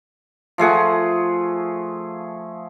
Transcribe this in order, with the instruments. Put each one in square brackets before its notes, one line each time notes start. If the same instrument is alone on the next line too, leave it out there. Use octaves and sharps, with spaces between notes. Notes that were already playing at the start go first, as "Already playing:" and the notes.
[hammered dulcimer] F3 A3 G#4 F#5